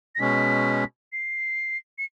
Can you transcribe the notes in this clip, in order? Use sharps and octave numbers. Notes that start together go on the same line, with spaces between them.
A#6
B2 G#3 C#4 B6
C7
C#7